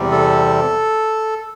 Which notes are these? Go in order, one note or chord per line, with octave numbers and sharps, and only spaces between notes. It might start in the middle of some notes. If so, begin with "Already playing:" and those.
Already playing: E2 C3 G3
A4